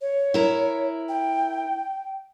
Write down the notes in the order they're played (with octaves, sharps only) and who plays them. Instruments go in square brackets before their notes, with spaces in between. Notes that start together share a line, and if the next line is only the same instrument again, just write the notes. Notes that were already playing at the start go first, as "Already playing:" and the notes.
[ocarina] C#5
[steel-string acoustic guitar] E4 A#4
[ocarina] G5